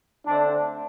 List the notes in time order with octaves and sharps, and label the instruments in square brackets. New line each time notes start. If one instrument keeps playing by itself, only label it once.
[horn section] D3 A3 C4 D4